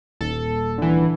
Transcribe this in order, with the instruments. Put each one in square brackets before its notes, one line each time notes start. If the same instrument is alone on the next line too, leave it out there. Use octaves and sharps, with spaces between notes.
[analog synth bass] D#1 [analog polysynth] A4
[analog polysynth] D3 E3